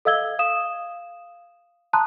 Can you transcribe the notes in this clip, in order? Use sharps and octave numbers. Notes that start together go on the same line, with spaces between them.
A4 D#5 F5 E6 G#6 G7
F5 D#6 E7
A5 A#5 C6 D#6 F#6